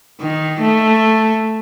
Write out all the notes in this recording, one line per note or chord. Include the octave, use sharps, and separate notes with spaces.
D#3
A3